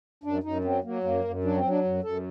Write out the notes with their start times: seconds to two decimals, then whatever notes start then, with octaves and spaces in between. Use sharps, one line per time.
0.24 F#2 D4
0.43 F#2 D#4
0.64 F#3 C4
0.84 F#3 A#3
1.04 F#2 A#3
1.24 F#2
1.44 F#3 D4
1.56 C4
1.63 F#3
1.70 D4
1.84 F#2
2.03 F#2 A4